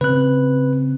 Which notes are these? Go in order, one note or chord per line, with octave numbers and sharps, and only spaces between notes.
C#3 C4 B4 F#6